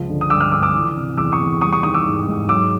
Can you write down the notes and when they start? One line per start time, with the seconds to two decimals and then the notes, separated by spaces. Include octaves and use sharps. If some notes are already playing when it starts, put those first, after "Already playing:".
Already playing: C#2 F3
0.09 D3
0.21 D#6
0.30 G2 D6 E6
0.41 D#6 F6
0.51 G2 D6 E6
0.63 D6 E6
0.74 E3
0.96 C3
1.17 E2 D6 E6
1.32 C#6 D#6
1.40 E2
1.61 G3 C#6 D#6
1.73 C#6 D#6
1.83 D#3 C#6 D#6
1.94 D6 E6
2.06 G#2
2.27 G#2
2.49 F#3 D6 E6